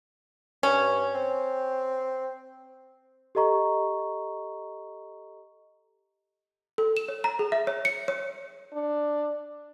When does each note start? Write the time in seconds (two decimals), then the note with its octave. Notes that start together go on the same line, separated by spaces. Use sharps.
0.63 G2 C#4
1.14 C4
3.35 G4 A4 D#5 A#5 C#6
6.78 A4
6.97 E7
7.08 C#5
7.24 A#5
7.39 G#4
7.52 E5
7.67 C#5
7.85 C#7
8.08 C#5
8.73 D4